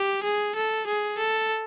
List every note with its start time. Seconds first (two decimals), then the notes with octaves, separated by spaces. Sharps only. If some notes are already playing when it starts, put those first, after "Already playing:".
Already playing: G4
0.23 G#4
0.56 A4
0.87 G#4
1.18 A4